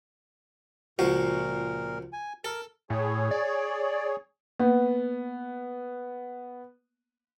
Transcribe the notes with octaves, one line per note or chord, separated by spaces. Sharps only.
C#2 A#2 F3 F#4 A#4
G#5
A4 A#4
A2 G#4 C#5
D5
A#3 B3